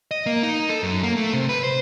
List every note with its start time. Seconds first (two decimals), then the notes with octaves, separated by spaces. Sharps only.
0.11 D#5
0.26 A#3
0.43 D#4
0.69 A4
0.83 F#2
1.03 A#3
1.17 A3
1.33 C3
1.49 B4
1.64 C5